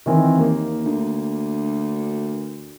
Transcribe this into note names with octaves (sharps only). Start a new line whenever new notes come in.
D#3 E3 C4
D#2 A#3
D2